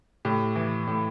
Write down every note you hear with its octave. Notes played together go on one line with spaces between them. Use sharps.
A2 G4
E3
A2